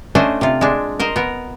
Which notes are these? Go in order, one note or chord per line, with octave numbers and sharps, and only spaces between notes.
A3 C#4 D4 C5 D#5
C3 F4
G#3 D4
A#4 C5 D#5
B3 A#4